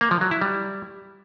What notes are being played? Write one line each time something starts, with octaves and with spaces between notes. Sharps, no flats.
A#3
F3
F#3
E4
G3